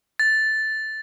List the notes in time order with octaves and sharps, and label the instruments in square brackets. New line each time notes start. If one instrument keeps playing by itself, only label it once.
[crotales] A6